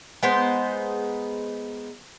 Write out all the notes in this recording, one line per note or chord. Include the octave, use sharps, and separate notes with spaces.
G#3 B3 D#4 C5